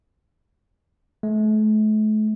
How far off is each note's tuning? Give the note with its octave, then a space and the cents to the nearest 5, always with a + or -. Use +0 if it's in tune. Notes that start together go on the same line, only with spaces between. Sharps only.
A3 -40